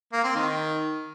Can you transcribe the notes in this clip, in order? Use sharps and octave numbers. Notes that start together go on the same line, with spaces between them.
A#3
C4
D#3